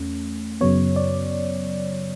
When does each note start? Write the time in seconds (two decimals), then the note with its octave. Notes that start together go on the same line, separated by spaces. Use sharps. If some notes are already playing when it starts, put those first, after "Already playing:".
Already playing: E2 A3 C#4
0.61 F#2 C#3 F#3 B3 C#5
0.96 D5